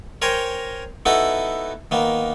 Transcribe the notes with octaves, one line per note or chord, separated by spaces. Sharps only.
A#4 C5 C#5 G5 G#5 A#5
B3 D#4 E4 F#4 A4 B4
D#3 A#3 B3